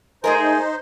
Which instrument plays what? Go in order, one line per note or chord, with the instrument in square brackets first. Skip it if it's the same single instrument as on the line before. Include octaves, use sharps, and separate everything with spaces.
[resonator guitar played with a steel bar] G#3 A3 A#4 [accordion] D#4 C5 [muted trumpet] G#4